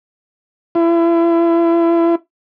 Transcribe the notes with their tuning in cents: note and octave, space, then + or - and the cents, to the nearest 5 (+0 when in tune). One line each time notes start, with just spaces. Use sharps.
E4 +35